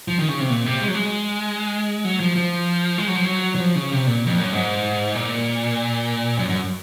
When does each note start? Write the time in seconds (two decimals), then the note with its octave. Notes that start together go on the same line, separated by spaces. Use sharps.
0.08 F3
0.18 D#3
0.28 C#3
0.40 C3
0.50 A#2
0.66 C3
0.82 G#3
0.88 F#3
0.95 G#3
2.05 F#3
2.20 F3
2.36 F3
2.98 G#3
3.07 F#3
3.15 F3
3.24 F#3
3.55 F#3
3.60 F3
3.76 C#3
3.92 C3
4.07 A#2
4.26 F2
4.38 F#2
4.53 G#2
5.15 A#2
6.39 F#2
6.49 F#2